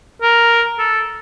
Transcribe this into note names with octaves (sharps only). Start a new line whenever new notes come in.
A#4
A4